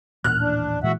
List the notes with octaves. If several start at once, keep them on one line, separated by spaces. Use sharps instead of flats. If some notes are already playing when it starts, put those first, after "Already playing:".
D#1 A1 A#2 F6 F#6
D4
A#2 E3 G#3 F#4 E5 F#5